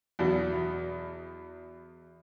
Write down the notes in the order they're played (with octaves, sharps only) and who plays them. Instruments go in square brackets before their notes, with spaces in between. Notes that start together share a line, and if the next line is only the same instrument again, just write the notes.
[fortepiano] E2 B2 F#3